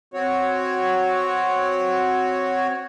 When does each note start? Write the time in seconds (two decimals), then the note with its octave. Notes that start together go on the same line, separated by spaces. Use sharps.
0.14 C4 F#4 C#5